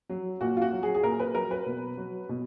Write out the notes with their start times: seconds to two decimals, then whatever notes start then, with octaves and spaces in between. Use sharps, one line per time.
0.09 F#3
0.41 A#2 F#4
0.57 F4
0.62 F#4
0.72 F#3
0.83 G#4
0.95 G#4
1.03 A#2 A#4
1.20 B4
1.35 F#3 A#4
1.51 B4
1.66 B2
1.97 F#3
2.29 B2